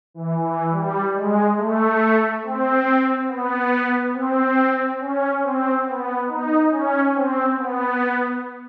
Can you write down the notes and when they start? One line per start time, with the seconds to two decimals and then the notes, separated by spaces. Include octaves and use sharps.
0.14 E3
0.43 E3
0.72 G3
1.14 G#3
1.57 A3
2.43 C4
3.28 B3
4.14 C4
4.99 C#4
5.42 C4
5.85 B3
6.27 D#4
6.70 C#4
7.13 C4
7.56 B3